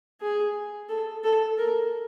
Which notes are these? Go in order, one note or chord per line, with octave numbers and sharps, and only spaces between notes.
G#4
A4
A4
A#4